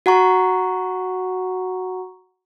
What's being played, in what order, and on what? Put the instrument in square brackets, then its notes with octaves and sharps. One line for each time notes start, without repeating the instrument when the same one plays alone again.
[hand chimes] F#4 F#5 A#5 C#6